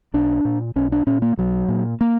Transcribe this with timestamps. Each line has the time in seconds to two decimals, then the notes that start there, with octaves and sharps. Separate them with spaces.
0.14 B1 D4
0.45 A#2
0.76 B1 C#4
0.92 D4
1.07 A#2 C#4
1.22 A#3
1.37 B1 F#3
1.68 A#2
2.01 A#3